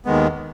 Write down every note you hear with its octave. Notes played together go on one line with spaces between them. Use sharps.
D#2 D#3 G#3 B3